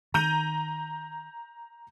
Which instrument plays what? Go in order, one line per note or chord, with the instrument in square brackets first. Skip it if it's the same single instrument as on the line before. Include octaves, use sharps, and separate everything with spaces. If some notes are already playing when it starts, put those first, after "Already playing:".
[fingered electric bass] D#3 [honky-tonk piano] A#5 G6 D#7